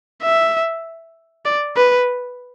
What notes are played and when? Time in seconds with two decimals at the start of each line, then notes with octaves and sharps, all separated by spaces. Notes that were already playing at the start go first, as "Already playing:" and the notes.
0.22 E5
1.45 D5
1.77 B4